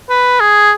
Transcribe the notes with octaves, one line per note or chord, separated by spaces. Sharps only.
B4
G#4